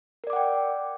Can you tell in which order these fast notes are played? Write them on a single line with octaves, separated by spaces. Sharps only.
A#4 D5 D6 F#5 G5